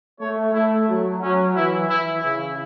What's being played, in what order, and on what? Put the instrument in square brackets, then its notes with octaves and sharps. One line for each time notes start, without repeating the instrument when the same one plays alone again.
[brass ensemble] A3 [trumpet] C#5
[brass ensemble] A3 [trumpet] E4
[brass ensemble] F#3
[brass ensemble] F#3 [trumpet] C#4
[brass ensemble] E3 [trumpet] E4
[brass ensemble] E3 [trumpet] E4
[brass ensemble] C#3 [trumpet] E4